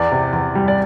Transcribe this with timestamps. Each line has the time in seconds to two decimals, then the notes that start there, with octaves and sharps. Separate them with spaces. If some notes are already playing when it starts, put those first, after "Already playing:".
Already playing: E2 D5
0.12 C3
0.33 E2
0.55 G3
0.68 D5